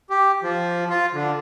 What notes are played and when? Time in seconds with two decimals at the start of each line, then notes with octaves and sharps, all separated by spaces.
0.10 G4
0.43 F3
0.90 F4
1.13 D3